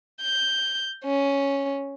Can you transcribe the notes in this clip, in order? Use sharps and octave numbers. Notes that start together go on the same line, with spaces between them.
G6
C#4